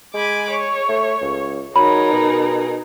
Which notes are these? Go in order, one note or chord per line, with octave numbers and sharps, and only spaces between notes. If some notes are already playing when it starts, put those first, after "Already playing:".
G#3 G#5 B5 D6
C#5
A3
C#2
F#3 D#4 G#4 A#4 B5
B2